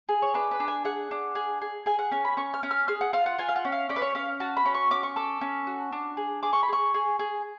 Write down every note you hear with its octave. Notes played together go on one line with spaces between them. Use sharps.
G#4
C#5
D4 B4
B4
D4
G#5
G#4 F#5
D4
G#4
G#4
G#4 G#5
F#5
C#4 G#5
B5
C#4 C#6
F6
C#4
F6
G#4 F6
F#5
F4 F5
F#5
F4 G#5
F5
F#5
C#4
F5
C#4 D5
B4
C#5
C#4 F5
F#4 A5
B5
C#4
C#6
C#4 D6
C#6
A4 D6
C#4
F#4
D4
G#4
G#4 D6
C#6
B5
G#4 C#6
G#4
G#4